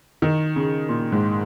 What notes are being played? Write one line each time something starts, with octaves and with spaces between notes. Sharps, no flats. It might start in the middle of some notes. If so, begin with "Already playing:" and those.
D#3
C#3
A#2
G#2